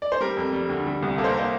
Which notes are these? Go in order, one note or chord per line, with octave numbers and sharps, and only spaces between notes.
D5
C5
G3 A#4
F2
G3
D2
G3
C2
A#3 A4
C5
A#4
A#3 C5